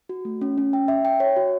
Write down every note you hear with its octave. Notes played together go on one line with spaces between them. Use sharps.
F#4
A3
C#4
C#4
G5
E5
G5
C#5
F#4